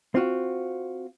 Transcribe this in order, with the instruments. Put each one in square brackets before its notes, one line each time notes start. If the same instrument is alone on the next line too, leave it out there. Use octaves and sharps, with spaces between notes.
[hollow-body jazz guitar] C4 F4 F#4